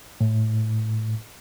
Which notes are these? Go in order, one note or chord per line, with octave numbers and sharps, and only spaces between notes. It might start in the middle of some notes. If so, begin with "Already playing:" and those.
A2